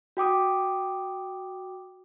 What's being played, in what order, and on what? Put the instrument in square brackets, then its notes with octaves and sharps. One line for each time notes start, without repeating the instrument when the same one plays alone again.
[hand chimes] F#4 G5 D6 D#6